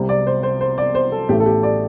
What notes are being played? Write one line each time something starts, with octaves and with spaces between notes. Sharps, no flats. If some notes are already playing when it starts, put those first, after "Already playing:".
Already playing: C2 C3 G3
D5
C5
C5
C5
D5
C5
A4
A1 A2 A3 G4
A4
G4
D5